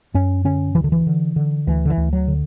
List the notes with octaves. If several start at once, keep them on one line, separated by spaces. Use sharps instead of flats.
F#2 C#4
D3 C#4
D2 E3
D3
E3
D3
D3
D2 E3
D3
E3
D2
F#3
D3